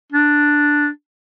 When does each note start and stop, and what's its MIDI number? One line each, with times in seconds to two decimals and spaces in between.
0.12 0.88 62